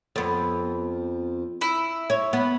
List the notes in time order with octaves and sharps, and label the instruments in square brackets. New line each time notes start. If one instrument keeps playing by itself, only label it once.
[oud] F2 B3
[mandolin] E4
[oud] C#5
B3